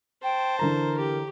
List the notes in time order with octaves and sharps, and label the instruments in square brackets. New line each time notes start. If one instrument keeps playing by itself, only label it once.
[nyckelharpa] C5 A5 [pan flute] G5
[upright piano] D3 E3 A#5 [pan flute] A#4
[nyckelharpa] G4